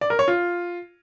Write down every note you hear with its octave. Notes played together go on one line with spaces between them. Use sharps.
D5
A#4
C#5
F4